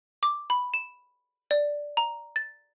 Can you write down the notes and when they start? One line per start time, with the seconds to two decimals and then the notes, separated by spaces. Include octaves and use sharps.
0.23 D6
0.50 B5
0.74 E7
1.51 D5
1.97 A#5
2.36 A6